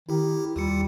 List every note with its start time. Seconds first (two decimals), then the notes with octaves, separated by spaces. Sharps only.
0.09 D#3 E4 G4
0.56 D#2 G3 F4 C#7